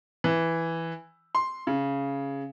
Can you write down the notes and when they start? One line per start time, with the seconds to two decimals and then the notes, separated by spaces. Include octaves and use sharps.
0.24 E3
1.35 C6
1.67 C#3